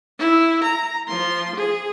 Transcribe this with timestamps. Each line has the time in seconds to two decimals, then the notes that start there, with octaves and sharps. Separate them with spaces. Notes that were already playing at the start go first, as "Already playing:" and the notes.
0.19 E4
0.63 A#5
1.08 F3 C6
1.55 G#4